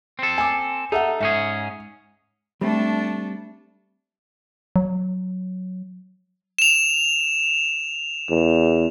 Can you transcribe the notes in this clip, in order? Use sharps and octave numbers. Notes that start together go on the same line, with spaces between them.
C4 A4
G#5 D6
D#4 A4 E5 F#5
G#2 C#4 G#4 E5
G3 A3 C4 D4
F#3
E7 F7
E2